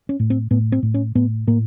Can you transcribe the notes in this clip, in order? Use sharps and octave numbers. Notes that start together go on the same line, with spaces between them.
C#4
A2
C4
A2 B3
C4
A2
C#4
A2 B3
A2 A#3